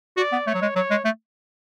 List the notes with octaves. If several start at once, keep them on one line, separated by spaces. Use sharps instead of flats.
F#4 D5
B3
A3 C#5
F#3
G#3
F#3 C#5
G#3
A3